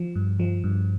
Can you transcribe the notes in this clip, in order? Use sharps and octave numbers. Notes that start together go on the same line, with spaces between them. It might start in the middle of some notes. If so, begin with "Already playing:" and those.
Already playing: F3
G2
F3
G2